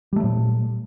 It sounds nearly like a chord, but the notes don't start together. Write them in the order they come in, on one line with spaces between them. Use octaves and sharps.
G3 A3 F#3 A#2